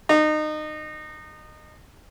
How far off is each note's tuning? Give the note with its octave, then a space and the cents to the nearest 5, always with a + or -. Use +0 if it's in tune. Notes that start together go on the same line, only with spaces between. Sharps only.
D#4 -25